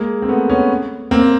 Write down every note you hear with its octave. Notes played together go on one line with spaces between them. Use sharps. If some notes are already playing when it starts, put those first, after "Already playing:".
Already playing: G#3 A#3
C4
A3 B3
B3 C#4
A#3 C4